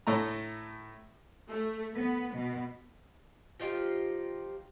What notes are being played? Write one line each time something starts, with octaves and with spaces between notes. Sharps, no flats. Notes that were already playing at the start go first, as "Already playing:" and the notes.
A2 A3 A#5
A3
B3
B2
F3 D#4 F4 G4